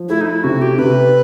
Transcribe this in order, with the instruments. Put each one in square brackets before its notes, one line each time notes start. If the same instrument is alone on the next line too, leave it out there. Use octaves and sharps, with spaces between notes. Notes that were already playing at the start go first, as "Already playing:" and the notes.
Already playing: [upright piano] F3
[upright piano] A3 [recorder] E4
[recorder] D#4
E4
[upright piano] C3 [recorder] F#4
[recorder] G4
[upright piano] C3 [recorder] B4